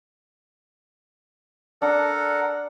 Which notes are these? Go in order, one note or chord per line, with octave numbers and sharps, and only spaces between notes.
D4 A4 A#4 F#5